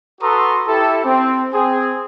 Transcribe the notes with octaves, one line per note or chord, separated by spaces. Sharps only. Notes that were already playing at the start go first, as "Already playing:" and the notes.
F#4 A4 B4 A#5 C6 D#6
E4 G4 A4
C4
C4 G#4